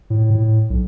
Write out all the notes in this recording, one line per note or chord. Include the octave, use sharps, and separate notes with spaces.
A2
A2
B1